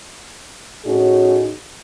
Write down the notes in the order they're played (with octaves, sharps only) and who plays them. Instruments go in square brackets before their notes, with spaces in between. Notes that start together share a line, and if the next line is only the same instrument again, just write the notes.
[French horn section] A2 C#4 D#4 F#4 G#4